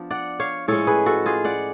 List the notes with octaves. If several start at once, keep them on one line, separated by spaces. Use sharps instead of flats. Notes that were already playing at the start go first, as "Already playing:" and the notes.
Already playing: F3 B3 D4
D5 F#5
C#5 F5
A2 F3 G#3 C#4 A4 C#5
G#4 B4
F#4 A4
F4 G#4
D5 F#5